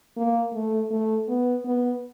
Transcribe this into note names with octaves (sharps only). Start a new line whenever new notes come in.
A#3
A3
A3
B3
B3